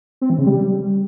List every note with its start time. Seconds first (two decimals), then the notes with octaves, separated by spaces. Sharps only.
0.21 C4
0.30 E3
0.38 C#3
0.46 G3